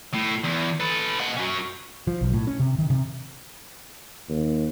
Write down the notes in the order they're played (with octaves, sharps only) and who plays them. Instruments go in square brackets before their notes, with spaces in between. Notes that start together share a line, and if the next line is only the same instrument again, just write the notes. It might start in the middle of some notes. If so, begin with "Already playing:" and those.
[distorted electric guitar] A2
E2
A4 B4
D#5 F#5
C#4 F#4
[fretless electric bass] F3
B1
A2
C#4
C3
D#3
C3
[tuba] D#2